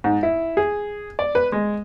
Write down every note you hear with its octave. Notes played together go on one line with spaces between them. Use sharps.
G#2
E4
G#4
D5
B4
G#3